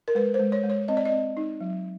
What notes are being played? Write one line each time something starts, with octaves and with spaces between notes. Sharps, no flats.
A#4
G#3 B4
C5
G#3
C#5
G#3
C#5
C4 D#5
D5
D#5
C4
D#4
F#3